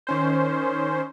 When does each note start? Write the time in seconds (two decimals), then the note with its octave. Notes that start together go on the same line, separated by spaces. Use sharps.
0.07 D#3 C#4 C5